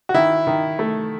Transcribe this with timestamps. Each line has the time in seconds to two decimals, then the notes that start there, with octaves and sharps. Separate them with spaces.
0.09 F#4
0.14 D#3 E4
0.47 D#3
0.79 A3